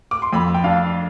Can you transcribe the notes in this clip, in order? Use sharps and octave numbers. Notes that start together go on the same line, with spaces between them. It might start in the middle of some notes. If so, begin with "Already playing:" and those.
D6
C6
F2 B5
G5
D4 F5